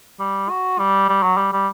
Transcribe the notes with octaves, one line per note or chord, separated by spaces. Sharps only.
G3
F#4
G3
G3
F#3
G3
G3